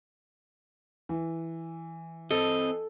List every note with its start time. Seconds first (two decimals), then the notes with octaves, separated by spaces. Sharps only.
1.09 E3
2.31 C4 A4 D#5